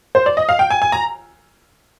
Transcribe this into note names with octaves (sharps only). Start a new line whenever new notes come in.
C5
D5
D#5
F5
G5
G#5
G#5
A#5